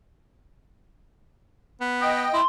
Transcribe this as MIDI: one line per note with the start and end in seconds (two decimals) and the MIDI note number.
1.81 2.27 59
2.01 2.40 75
2.01 2.40 79
2.01 2.30 87
2.33 2.42 64
2.33 2.45 84